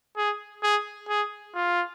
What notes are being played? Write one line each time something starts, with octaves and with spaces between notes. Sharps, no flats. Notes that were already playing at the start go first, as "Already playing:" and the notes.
G#4
G#4
G#4
F4